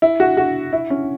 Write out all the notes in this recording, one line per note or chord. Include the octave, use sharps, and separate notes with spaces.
E4
F#4
F#4
E4
C#4